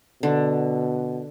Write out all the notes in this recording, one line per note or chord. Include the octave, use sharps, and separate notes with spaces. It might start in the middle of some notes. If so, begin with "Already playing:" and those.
B2 D3